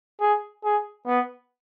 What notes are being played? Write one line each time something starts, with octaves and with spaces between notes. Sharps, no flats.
G#4
G#4
B3